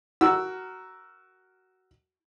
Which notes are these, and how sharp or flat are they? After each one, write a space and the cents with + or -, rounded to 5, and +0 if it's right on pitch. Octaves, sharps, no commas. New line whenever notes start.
F#4 +15 A#4 +0 E6 +0